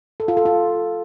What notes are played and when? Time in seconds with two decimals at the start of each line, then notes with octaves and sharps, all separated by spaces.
0.20 A4
0.28 F4
0.37 A4
0.45 F4